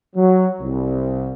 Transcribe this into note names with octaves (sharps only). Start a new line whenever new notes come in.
F#3
C2